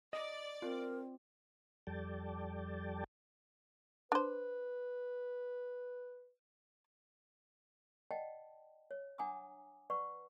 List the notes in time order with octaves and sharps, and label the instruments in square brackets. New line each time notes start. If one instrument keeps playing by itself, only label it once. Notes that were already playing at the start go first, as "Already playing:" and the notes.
[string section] D5 [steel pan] D#5
[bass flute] C4 [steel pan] F4 [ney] A#4
[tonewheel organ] F2 G3 A4 D5 G5 A5
[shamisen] D4 C5 [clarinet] B4
[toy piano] D5 D#5 F#5 G5 A5
C#5
D4 F#5 G#5 A#5 D6 D#6
B4 D5 F#5 C#6